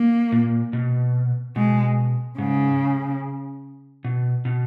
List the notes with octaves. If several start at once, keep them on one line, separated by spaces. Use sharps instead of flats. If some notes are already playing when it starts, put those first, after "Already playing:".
Already playing: A#3
A#2
B2
B2 G#3
G#2 C#3
B2
B2